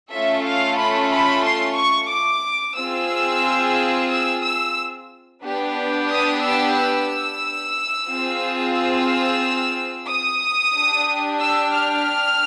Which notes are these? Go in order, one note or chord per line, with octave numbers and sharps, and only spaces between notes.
A3 C#4 F4 A4 E5
F5
B5
B5
C6
C#6
D6
C4 F4 G#4 E6
E6
E6
B3 D4 G4
D#6
E6
E6
C4 F4 G#4
E6
D#6
D4 G4
E6
F6